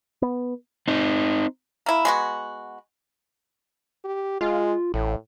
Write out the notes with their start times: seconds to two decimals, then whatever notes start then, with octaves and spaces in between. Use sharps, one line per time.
0.22 B3
0.88 C4 D#4
1.86 A#3 E4
2.05 G#3 B3 F#4
4.05 G4
4.41 G#3 F4
4.94 A1 A2